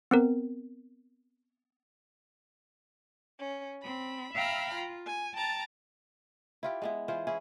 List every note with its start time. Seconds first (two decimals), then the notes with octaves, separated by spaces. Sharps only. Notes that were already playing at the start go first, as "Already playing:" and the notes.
0.11 B3 C4 A#4
3.38 C#4
3.83 C4 B5
4.35 E5 F5 G5 A#5 B5 F6
4.75 F4
5.05 G#5
5.35 G5 A5 A#5 A6
6.63 E4 F4 G4
6.82 G#3 B3 E4
7.08 E3 F4 G#4 C5
7.27 C#4 E4 G#4